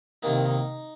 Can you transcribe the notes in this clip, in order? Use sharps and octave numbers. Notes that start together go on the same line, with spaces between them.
C2 C3 D#3 A#3 D#4
D#4